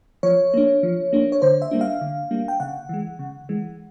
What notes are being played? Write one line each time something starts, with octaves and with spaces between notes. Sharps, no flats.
F3 C#5
A#3 D4
F3
A#3 D4
C#5
D3 C5
E5
G3 A#3 D4
F5
D3
G3 A#3 D4
G5
C#3 F#5
E3 G#3
C#3
E3 G#3